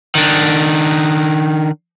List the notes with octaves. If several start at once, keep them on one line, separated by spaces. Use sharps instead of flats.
D#3 D4